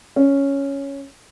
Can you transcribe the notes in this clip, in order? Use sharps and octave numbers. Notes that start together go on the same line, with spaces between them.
C#4